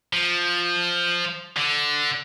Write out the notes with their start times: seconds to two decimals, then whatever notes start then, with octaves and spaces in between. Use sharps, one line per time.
0.13 F3
1.57 D3